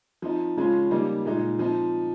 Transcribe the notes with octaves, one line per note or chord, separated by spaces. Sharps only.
F3 C4 D#4
C#3 F3 G#3 C#4 F4
C#3 G3 A#3 D#4
A#2 G#3 D#4
F3 C4 D#4